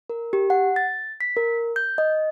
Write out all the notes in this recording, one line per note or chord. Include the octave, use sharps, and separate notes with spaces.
A#4
G4
F#5
A6
B6
A#4
G6
D#5